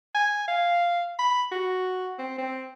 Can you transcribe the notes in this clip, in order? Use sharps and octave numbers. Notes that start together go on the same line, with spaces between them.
G#5
F5
B5
F#4
C4
C4